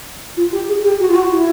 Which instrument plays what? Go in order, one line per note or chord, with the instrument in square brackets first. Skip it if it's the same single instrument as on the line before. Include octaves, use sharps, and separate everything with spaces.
[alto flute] F4
G4
G#4
G4
F#4
F4
F#4
E4